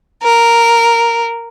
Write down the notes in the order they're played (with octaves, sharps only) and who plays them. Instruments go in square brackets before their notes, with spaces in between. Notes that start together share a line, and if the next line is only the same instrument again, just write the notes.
[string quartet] A#4